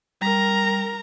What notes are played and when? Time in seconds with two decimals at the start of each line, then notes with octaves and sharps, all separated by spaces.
0.21 G3 A#4 A#5